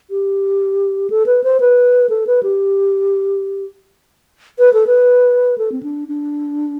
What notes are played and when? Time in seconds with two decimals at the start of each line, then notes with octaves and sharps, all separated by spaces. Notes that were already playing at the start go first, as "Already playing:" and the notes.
0.10 G4
1.10 A4
1.26 B4
1.44 C5
1.60 B4
2.09 A4
2.27 B4
2.43 G4
4.59 B4
4.73 A4
4.87 B4
5.58 A4
5.72 C4
5.83 D4
6.08 D4